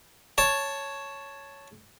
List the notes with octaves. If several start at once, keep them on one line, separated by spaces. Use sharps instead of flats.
C#5 A5